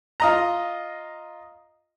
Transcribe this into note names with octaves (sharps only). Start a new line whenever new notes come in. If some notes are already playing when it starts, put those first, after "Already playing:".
F4 D#5 A#5